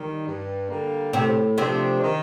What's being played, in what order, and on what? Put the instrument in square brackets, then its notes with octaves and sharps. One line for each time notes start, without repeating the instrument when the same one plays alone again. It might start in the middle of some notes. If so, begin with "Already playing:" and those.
Already playing: [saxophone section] D#3 G3
G2
D3 G3 A#3
[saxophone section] A2 [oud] C3 C4
[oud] C3 C4 [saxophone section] F3 A3 D4
[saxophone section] D#3